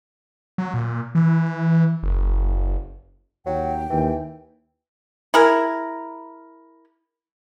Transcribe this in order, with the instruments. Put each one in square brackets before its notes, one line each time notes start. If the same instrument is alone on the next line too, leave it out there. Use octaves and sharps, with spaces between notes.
[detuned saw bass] F#3
A#2
E3
F#1
[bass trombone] D#2 [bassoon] F#3 [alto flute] G5
[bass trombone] D#2 [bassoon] E3
[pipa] E4 G#4 A#4